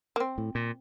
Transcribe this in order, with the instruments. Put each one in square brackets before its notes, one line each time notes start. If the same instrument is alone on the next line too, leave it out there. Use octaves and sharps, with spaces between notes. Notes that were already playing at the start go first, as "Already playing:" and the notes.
[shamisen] A#3
C4
[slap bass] A2
A#2